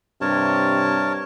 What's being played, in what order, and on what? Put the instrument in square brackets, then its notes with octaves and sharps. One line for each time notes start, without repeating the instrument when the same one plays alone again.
[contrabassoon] G2 [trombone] C3 [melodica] A#4 C#5 A5